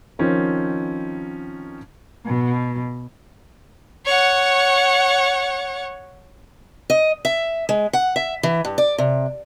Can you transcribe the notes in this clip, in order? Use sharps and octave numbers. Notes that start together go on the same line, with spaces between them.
D#3 F3 C4 C#4 D#4
B2
C#5 F#5
D#5
E5
G#3
F#5
E5
E3
G2
D5
C3